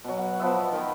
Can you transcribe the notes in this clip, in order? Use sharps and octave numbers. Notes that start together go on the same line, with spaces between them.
B2 F#3
F#5
F3 B3 E5
D#5
D#3 A#4 G5 B5